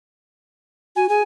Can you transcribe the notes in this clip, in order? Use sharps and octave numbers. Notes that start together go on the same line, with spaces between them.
F#4 G#5
G#4 G#5